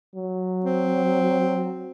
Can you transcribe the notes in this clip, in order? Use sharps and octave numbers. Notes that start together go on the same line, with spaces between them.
F#3
C4